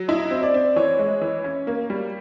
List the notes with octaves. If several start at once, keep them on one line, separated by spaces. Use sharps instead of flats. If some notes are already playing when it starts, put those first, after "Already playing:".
Already playing: F#3
E4 D#5
C4
D5
C4
E3 C#5
G#3
E3
C#4
A#3
G3